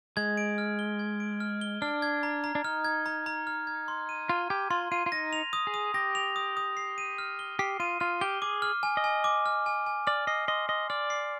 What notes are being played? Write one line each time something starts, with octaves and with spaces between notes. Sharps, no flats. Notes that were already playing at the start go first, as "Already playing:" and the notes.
G#3 G#6
D7
F6
G7
G#6
D7
F6
G7
D4 F6
G#6
A#5
A#5
D4
D#4 F6
G#6
A#5
A#5
F6
G#6
C6
D#7
F4 F6
G4 G#6
F4 C6
F4 D#7
F4
D#4 A#6
F7
D#6
G#4
D#6
G4 A#6
F7
D#6
D#6
C7
D#7
F6
G7
G4 C7
F4 D#7
F4 F6
G4 G7
G#4 D6
F6
G#5
D#5
G#5
D6
F6
G#5
G#5
D5 F6
D#5 C7
D#5 C6
D#5 C6
D5 F6
C7